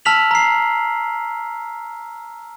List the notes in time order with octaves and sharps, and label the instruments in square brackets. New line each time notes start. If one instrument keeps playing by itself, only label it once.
[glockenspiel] A5 E6 F6 B6 F7 F#7
A#5 C7